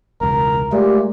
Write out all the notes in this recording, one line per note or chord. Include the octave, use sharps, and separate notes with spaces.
E1 C#2 A#4
A#2 G#3 A3 G4